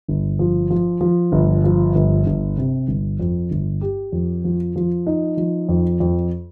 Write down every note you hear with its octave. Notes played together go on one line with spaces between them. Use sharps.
G1
F3
F3
F3
G1
F3
G1
G1
C3
G1
F2
G1
G4
F2
F3
F3
D#4
F3
F2
F2